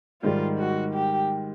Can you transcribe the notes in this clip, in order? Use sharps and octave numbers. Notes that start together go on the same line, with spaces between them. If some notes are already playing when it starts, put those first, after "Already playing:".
G#2 D#3 G3 F4
F#4
G4